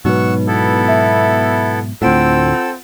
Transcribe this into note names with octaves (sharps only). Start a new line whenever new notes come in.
G#2 B2 F#3 D#4 B4 F#5 C#6 E6
B3 E4 A4
E5
D2 A2 C4 F4 A4 F#5 E6 D7